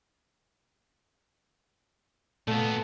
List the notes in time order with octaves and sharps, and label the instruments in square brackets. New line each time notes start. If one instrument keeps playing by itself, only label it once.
[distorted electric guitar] A#2 B3 [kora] A3